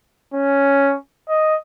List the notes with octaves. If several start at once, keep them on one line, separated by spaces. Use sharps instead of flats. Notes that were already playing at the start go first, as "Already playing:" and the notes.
C#4
D#5